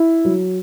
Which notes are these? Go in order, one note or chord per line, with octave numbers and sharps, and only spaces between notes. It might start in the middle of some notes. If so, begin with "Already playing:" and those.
Already playing: E4
F#3